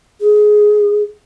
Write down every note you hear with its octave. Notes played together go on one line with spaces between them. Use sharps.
G#4